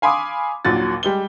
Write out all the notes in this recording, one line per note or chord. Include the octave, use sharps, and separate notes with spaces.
F5 G#5 B5 C6 D6 D#6
A#1 D#2 A#2 F#3 F#4 A6
G3 G#3 G7